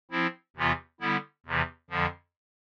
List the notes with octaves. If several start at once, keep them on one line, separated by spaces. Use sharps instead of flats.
F3 C4 E4
E2 C3 E3 B3 F4
D3 G3 B3 E4
E2 C3 E3
F2 D3 F3